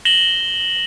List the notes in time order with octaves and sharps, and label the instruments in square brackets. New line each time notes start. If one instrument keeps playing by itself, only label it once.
[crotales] A#6 E7 F#7 G7